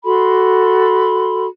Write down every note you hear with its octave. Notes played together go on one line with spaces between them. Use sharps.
F#4 A4 B5 C6